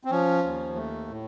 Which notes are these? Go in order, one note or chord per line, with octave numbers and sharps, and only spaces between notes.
C4
F3 C#4
D#2
A3
A2